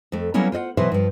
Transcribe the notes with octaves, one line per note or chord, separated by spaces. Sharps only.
F2 A3
F#3 G3 A#3 B3 C#4 E4
F4 C5 D#5 F#5
B2 E3 F#3 B4 C5 E5
G2 F3